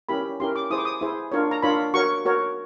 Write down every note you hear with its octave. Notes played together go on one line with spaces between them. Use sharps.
C#4 E4 G4 A#4 B5
C#4 E4 G4 A#4 C6
D6
E4 G#4 C5 D#6
D6
D#6
E4 G#4 C5
D4 F4 A#4 C#5
A#5
D4 F4 A#4 C#5 B5
F#4 A#4 C#5 C#6
F#4 A#4 C#5